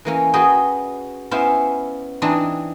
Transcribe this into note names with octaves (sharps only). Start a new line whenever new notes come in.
E3 A#3 C#4
F#4 G#4 B4 D#5 G5
B3 C#4 E4 C5 F5
E3 C4 D4 D#4